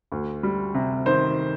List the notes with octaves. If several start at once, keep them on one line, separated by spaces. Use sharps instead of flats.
D2
G3
C3
D#3 C5